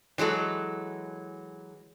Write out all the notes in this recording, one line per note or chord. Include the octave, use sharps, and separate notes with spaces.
E3 F#3 G#3 A4